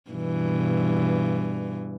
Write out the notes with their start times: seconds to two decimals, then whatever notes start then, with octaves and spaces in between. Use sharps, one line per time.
0.11 G2 B2 E3